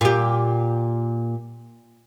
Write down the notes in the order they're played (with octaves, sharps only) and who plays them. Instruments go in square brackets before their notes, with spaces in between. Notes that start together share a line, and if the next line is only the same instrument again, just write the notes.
[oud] A#2 G4